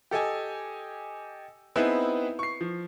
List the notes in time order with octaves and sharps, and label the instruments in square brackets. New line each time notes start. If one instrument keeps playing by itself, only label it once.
[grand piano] G4 A4 D#5 G#5
B3 C4 D#4 E4 G#4 B4
C#6 C7
F3